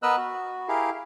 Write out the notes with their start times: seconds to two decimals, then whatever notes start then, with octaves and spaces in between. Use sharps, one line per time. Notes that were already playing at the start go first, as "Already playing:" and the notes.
0.03 B3 A#4 B4 D#5 E6 F#6
0.17 F#4
0.68 E4 G4 G#4 A#4 F5